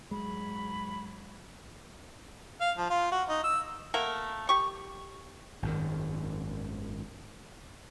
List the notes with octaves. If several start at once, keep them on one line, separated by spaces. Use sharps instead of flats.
G#2 F#3 G#3 B5
F5
F3
F4
F#4
D#4
E6
A3 A#3 A#4 F#5
G4 C#6
G#1 F#2 D#3